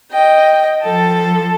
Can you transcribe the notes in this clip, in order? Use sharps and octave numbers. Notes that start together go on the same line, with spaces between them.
D#5 G5
F3 A4 A5